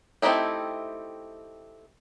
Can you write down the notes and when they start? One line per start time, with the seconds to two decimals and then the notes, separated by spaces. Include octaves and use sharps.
0.22 A3 C4 D#4 E4 G4